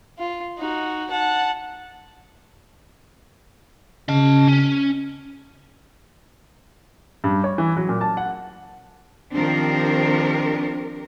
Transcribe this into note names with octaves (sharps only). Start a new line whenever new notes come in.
F4
D#4 F#4
F#5 A5
C#3 D#5 A5
C#4
G2
C#5
E3
F#3
A#2
A5
F#5
D#3 F3 C4 D4 G4 A#4